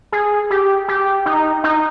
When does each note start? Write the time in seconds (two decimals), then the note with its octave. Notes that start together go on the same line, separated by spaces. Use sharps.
0.12 G#4
0.50 G4
0.88 G4
1.26 D#4
1.64 D#4